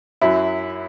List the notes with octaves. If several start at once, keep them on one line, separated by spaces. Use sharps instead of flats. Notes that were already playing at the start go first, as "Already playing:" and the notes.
F#2 F#3 E4